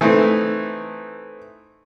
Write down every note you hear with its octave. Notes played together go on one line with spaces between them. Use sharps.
E3 A3 C4 D#4